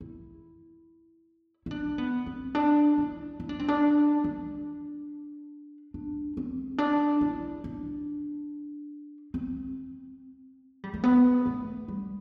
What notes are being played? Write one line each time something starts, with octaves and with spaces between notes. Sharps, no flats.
E4
E4
D4
B3
C4
D4
E4
E4
D4
C4
D4
D4
D4
C4
D4
E4
D4
C4
G3
A3
B3
A3
G3